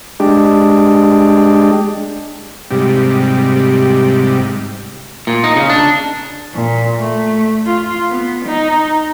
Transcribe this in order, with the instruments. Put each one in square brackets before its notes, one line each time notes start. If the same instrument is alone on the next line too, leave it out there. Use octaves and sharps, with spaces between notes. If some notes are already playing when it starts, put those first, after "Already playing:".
[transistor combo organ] G#3 D4 G4
G#2 C3 G3
[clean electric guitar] A#2
D#4
C#3
D4
[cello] A#2
A3
F4
B3
D#4